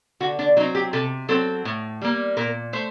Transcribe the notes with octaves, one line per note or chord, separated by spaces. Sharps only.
D3 F#4
D4
F#3 C4 D#4
G4
C3 A4
F#3 C4 A4
A2
G3 A#3
A#2 A#4
A3 C5